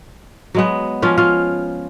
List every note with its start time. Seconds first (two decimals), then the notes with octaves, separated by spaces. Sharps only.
0.55 F#3 G#3 B3
1.02 F3 C#4 F4
1.17 C#4 F4 F5